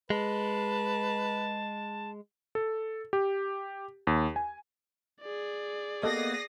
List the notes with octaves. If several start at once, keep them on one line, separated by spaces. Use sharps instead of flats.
G#3 B4 A5
A4
G4
D#2
G#5
G#4 D5
A#3 B3 G4 A4 D#5 D#6 A#6 C7